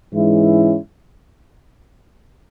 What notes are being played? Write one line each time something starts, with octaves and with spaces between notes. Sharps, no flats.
G#2 E3 G#3 C#4 E4